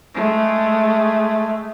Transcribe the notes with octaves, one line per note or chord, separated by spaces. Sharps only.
G#3 A3